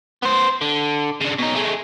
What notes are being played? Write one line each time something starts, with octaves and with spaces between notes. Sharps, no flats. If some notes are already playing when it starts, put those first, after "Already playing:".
B3 C5
D3
C#3 D4
B2 D#4
G#3 A3